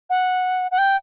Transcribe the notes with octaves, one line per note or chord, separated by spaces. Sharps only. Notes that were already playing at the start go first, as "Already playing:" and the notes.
F#5
F#5
G5